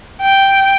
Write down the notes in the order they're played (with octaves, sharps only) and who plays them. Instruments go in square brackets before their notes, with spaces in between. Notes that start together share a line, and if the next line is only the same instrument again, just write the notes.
[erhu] G5